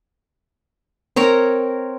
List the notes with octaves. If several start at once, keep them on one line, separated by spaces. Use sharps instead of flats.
C4 A#4 C#5 A#5